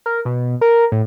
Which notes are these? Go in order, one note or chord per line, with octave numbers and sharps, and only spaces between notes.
A#4
B2
A#4
A2